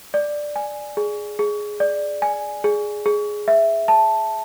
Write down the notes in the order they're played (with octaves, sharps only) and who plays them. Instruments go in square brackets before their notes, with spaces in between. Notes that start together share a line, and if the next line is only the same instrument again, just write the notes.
[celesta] D5
G#5
G#4
G#4
D5
G#5
G#4
G#4
E5
A5